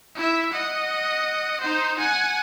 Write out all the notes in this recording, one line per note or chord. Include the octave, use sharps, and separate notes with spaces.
E4 E5
D#5 F#5
D#4 C5
F#5 G#5